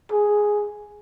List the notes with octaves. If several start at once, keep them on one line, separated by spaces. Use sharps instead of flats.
G#4